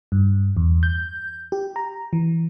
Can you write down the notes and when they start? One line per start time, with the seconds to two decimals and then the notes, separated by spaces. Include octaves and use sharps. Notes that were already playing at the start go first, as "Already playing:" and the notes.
0.12 G2
0.57 E2
0.83 G6
1.52 G4
1.76 A#5
2.13 E3